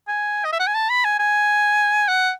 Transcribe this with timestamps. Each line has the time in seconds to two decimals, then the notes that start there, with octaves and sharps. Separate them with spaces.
0.08 G#5
0.45 D#5
0.53 E5
0.60 F#5
0.67 G#5
0.75 A5
0.90 B5
1.04 G#5
1.19 G#5
2.08 F#5